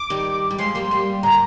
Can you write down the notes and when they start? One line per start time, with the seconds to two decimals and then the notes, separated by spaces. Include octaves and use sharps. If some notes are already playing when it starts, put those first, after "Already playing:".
Already playing: D6
0.10 D#3 G3
0.51 G3
0.58 F3 G#3 C6
0.75 G3 A#3
0.91 G3 A#3
1.23 A#2 D3 A#5